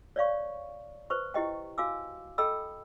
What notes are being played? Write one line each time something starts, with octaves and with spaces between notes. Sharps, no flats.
C#5 D5 F5 C#6
B4 C5 C#6
E4 G4 D#5 G5
F#4 F5 G#5 D6 E6
A4 D#5 G5 B5 E6